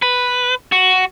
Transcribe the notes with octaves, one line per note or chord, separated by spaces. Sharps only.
B4
F#4